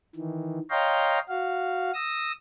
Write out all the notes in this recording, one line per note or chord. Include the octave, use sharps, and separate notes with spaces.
D#3 E3
C#5 D#5 F5 G5 A#5 C6
F#4 F5
D#6 E6 A#6